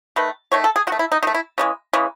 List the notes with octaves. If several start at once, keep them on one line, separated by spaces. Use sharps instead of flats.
D#3 A3 B4
D#3 A3 C#5
A4
G#4
D#3 F#4
A3
E4
D#4
D#3 A3 D#4
E4
C#3 E3 G#3
C#3 E3 G#3